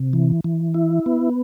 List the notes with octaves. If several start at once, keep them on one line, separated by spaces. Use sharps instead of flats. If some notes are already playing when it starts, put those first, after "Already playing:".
Already playing: C3
E3
E3
E4
B3